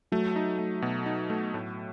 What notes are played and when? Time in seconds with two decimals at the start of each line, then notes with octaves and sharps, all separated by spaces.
0.12 F#3 A3
0.36 D#4
0.59 A3
0.82 B2
1.06 D#4
1.30 A3
1.54 A2